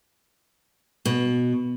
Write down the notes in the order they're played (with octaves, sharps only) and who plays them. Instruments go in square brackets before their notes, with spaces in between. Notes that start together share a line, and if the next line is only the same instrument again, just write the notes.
[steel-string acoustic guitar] B2